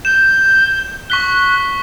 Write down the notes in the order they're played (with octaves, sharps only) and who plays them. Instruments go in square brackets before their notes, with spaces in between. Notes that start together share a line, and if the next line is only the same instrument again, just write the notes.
[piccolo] G6 [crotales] E7
[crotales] C#6 B6 G7 [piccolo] F#6